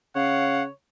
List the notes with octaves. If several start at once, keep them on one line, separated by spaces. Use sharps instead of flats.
C#3 C#5 F5 F#5